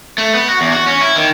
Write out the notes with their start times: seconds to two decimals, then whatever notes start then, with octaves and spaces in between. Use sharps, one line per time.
0.18 A3
0.34 B3
0.49 F#4
0.61 E2
0.73 F#4
0.87 C#4
1.01 E4
1.16 D#3